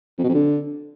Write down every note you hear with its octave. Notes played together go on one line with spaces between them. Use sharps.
F2
B2
F2
D3